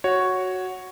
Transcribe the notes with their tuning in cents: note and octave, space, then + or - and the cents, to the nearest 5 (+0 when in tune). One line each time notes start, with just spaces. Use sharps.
F#4 +0 C#5 +0